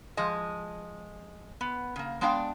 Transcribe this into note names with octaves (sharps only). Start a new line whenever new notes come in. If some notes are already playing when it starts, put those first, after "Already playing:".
F3 G#3 D#5
B3
C#3 A#3
G#3 B3 D4 D5 F5 G5